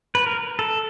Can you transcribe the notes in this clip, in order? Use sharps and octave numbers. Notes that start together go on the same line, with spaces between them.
B4
A#4
A4